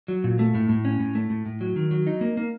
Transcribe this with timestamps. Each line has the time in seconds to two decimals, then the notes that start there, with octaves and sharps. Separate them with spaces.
0.08 F#3
0.24 A#2
0.39 A3
0.55 A2
0.69 A2
0.85 C#4
1.00 A2
1.15 A3
1.30 A2
1.46 A2
1.61 F#3
1.76 D#3
1.91 F#3
2.07 D#4
2.21 A#3
2.37 A#3